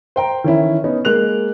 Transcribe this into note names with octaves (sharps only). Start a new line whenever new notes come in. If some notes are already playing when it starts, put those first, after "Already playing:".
C5 G5 A#5
D#3 E3 C#4 E4
B3 C#4 D#4
G#3 A#3 F#6 F7